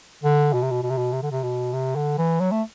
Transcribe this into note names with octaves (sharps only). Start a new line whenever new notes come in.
D3
B2
C3
B2
B2
C3
B2
C3
D3
C3
B2
C3
D3
E3
F#3
A3